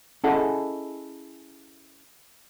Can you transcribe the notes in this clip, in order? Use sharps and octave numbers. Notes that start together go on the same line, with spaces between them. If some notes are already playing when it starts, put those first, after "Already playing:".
C#4 E4 G#4 A4 D#5 F#5